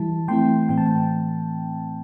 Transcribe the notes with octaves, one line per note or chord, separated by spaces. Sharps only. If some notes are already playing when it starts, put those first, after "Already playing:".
Already playing: E3 G3 E4 A5
E3 A3 C4 E4 G5 C6
A2 E3 A3 C4 G5
A5
G5